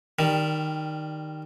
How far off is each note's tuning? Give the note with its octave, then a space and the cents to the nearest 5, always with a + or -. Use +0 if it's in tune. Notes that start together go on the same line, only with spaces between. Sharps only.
D#3 -10 G3 +0